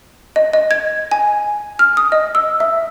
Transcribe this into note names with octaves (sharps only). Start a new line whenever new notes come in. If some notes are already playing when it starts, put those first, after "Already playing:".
D#5
D#5
G#6
G#5
F6
D#6
D#5
E6
E5